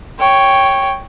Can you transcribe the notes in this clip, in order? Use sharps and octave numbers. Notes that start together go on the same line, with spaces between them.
C#5 G5